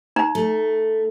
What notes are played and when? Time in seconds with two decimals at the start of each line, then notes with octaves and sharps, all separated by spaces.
0.16 D#4 A#5
0.35 A3